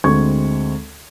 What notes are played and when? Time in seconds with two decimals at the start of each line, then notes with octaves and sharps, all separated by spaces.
0.04 D2 G#3 C4 C#6 G#6